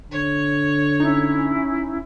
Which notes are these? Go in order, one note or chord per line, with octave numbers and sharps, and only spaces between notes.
D3 C#5
C#4 D#4 E4